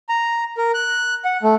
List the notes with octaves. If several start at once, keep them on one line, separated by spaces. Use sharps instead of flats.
A#5
A#4
F#6
F#5
A3